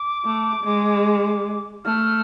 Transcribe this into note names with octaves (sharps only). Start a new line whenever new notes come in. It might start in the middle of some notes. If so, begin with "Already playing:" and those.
Already playing: D6
A3
G#3
A3 F6